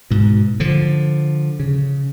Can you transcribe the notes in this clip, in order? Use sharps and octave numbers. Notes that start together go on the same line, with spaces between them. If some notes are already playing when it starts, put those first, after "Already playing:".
G#2 B2
D3 F3
C#3